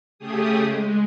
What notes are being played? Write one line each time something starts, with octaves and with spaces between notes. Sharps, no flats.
C#3 A3 G4 G#4 D#6
G#3